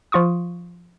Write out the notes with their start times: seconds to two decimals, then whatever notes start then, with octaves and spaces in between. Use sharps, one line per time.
0.12 F3 F4 C#6 D#6